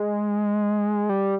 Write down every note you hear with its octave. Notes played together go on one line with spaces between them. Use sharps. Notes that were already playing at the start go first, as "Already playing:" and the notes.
Already playing: G#3
G3